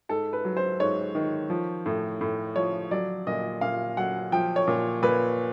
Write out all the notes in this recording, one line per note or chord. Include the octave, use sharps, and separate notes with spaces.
G#2 A4
B4
F#3
C5
G#2 C#5
D#3
F3
A2
A2
F3 C#5
F#3 D5
A#2 D#5
A#2 F5
F#3 F#5
F3 G5
C#5
A#2
A#2 B4